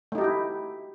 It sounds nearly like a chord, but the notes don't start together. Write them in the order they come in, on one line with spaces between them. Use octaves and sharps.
A3 D#4 G4 F#4 E4